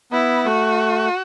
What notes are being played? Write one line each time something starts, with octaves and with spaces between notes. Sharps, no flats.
B3 E4
A3 F#4